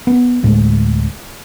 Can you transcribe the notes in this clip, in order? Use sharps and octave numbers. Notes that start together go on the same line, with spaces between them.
B3
D2 A2 G#3